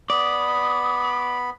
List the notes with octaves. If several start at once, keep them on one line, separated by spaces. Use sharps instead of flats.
B3 D5 B5 D#6